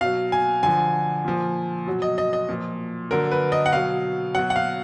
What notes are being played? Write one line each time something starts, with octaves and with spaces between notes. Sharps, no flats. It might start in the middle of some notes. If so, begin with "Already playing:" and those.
B2 F#3 F5
G#5
D3 F3 G#5
A#2 F3
B2 F#3
D#5
D#5
D#5
A#2 F3
D3 F#3 A#4
B4
D#5
F#5
B2 F#3 F5
B2 F#3 F#5
F#5
F5